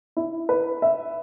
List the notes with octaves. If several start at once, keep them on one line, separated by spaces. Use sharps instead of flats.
E4
B4
E5